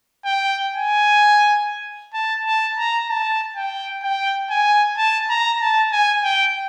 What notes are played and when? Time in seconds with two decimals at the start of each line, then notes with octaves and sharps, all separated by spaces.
0.25 G5
0.73 G#5
2.14 A5
2.46 A5
2.77 A#5
3.09 A5
3.56 G5
4.03 G5
4.50 G#5
4.97 A5
5.30 A#5
5.60 A5
5.92 G#5
6.24 G5